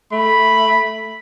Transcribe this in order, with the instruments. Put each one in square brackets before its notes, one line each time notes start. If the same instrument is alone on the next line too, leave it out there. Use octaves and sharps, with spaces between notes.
[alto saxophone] A3 [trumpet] B5